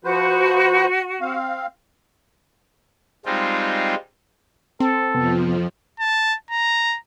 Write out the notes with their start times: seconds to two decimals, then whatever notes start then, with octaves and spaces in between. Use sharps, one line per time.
0.04 F3 F#4 B4 C5
1.21 C4 F5
3.26 G3 G#3 C4 D#4 F4
4.80 C4 A4
5.15 F2 C3 F3 B3
6.00 A5
6.50 A#5